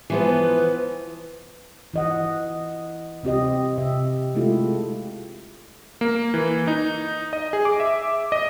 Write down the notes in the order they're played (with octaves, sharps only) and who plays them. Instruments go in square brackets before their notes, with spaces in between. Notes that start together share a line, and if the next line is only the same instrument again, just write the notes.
[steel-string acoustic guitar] E3 F3 B3
[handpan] E3 D#5 F#5
C3 C4 G4 D#5
C3 E5
G#3 A3 E4 F4 G4
[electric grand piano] A#3
E3
D#4
D#5
G#4
D6
E5
D#5